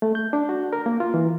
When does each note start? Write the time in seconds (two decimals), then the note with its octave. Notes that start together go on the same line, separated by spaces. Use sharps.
0.02 A3
0.15 G6
0.33 D4
0.49 F#4
0.73 A#4
0.86 A#3
1.00 F4
1.14 E3